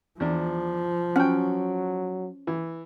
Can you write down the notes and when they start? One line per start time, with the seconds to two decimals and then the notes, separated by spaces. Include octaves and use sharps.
0.20 E2 F3 D4
1.16 F#3 C#4 F#5 G5
2.47 E3